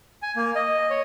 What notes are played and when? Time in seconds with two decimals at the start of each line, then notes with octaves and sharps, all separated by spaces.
0.22 G#5
0.36 A#3
0.55 D#5
0.90 C#5